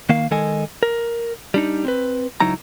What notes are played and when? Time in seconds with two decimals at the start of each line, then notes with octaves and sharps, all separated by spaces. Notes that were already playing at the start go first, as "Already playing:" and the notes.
0.09 D#3 A#3 F5
0.31 D#3 G#3 A4 D#5 G#5
0.83 A#4
1.54 G3 D4 D#4
1.85 C4 B4
2.40 C#2 F#3 D#4 E4 A#5